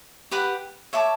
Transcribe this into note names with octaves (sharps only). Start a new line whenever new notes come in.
G4 B4 F#5
C#5 E5 A5 D6